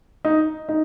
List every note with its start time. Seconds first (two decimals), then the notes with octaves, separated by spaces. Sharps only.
0.25 D#4
0.69 D#4